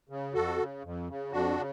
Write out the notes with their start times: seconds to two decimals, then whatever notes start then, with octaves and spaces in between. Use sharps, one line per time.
0.09 C#3
0.34 F2 F#4 A4
0.58 C#3
0.84 F2
1.08 C#3
1.32 F2 D4 F#4
1.57 C#3